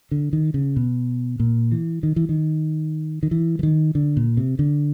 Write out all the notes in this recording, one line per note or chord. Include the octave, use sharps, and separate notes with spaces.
D3
D#3
C#3
B2
A#2
E3
D#3
E3
D#3
D#3
E3
E3
D#3
D3
A#2
C3
D3